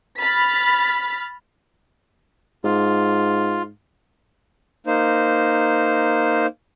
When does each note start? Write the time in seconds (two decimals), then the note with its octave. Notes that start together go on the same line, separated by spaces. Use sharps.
0.18 B5 F6 A6 B6
2.64 G#2 F4
4.87 A#3 D#4 C5